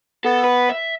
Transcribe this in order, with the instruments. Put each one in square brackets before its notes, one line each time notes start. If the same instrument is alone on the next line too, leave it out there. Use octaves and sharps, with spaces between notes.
[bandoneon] B3 [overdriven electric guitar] A4
[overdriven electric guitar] B4
E5